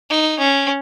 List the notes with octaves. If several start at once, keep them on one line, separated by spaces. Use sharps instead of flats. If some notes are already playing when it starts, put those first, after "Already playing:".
D#4
C#4